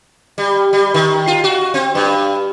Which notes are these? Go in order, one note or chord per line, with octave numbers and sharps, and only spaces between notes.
G3
G3
D#3
F4
F#4
C4
G2